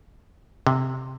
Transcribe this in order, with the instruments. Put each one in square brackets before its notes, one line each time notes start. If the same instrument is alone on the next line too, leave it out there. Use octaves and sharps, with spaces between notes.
[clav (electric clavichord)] C3